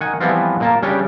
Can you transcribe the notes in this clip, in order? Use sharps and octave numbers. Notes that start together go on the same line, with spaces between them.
D#3 F#5 G#5
E3 F3 G3 B3 C4 F4
A#2 A#3 A5
C#3 G3 C#4 D4 G4